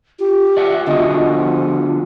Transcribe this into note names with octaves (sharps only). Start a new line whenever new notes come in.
F4 G4
D5 E5 F#5
D3 B3 F#4 D#5
F3